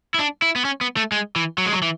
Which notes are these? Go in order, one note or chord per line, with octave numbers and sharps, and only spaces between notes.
E4
D4
E4
B3
C#4
B3
A3
G#3
E3
F#3
G#3
F#3
E3